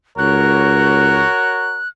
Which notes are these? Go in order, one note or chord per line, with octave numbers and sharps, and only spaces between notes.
C#2 F#4 A#4 C#5 F#6